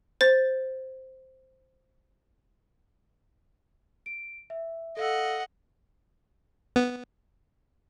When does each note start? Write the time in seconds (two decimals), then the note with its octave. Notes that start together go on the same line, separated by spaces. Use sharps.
0.21 C5 A6
4.06 D7
4.50 E5
4.97 A4 D#5 F5 F#5 E6
6.76 B3